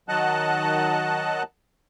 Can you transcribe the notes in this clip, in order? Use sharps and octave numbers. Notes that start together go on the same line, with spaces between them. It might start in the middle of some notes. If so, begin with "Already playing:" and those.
D#3 F#3 D#5 F#5 A5 F#6